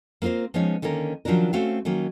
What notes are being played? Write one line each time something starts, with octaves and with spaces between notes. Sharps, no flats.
A#3 C4 F4 A#4 C5
F3 G#3 B3 C#4 D#4 C#5
D3 D#3 A#3 C#4 A#4
D#3 F3 F#3 C#4 D4 A#4
A3 C4 C#4 F#4 F5
D#3 F#3 A#3 C#4